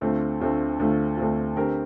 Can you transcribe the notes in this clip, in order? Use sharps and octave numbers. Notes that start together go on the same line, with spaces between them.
D2 D3 A3 C4 F4
D2 D3 A3 C4 F4
D2 D3 A3 C4 F4
D2 D3 A3 C4 F4
D3 A3 C4 G4 A#4